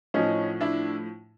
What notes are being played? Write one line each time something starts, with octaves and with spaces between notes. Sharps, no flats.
A2 F3 C#4 D#4
D4 E4